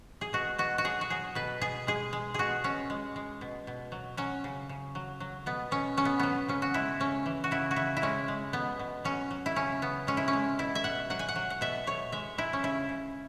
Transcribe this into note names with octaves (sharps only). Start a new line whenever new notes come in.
G#4
B2 F#4
B2 F#4
F#4
F#3 G#4
F#4
F#3 G#4
B2 B4
B2 G#4
G#3 G#4
G#3
B2 F#4 G#4
B2 C#4
G#3
G#3
B2
B2
F#3
F#3 C#4
C#3
C#3
F#3
F#3
B2 B3
B2 C#4
F#3 C#4
B3
F#3 B3
C#3 C#4
F#4
G#3 E4
C#3 C#4
E3
F#4
C#3 E4
F#4
C#3 E4
E4
G#3 C#4
G#3
B2 B3
B2
F#3 C#4
F#3
E4
C#3 C#4
C#3 B3
G#3 C#4
E4
C#4
G#3
B2 E4
E5
B2 F#5
F#3 F#5
G#5
F#5
F#3
F#5
B2 E5
B2 C#5
G#3 E5
G#3 E4
C#4
C#3 E4
C#3